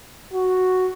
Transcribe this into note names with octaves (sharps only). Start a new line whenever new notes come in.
F#4